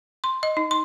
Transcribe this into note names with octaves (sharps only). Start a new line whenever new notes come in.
C6
D#5
D#4
C6